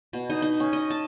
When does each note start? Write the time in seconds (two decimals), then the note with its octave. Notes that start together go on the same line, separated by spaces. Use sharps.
0.13 B2
0.30 D#4
0.42 D#4
0.60 C#4
0.73 D#5
0.90 A5